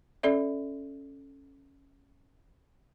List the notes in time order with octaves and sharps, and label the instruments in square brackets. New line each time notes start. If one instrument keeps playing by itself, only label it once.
[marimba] C#4 A4 D5 E5